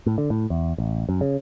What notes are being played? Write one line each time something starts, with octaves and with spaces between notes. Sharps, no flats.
A2
D3
A2
E2
A1
F#2
C#3